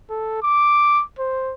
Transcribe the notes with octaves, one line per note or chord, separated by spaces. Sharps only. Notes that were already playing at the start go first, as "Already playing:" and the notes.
A4
D6
C5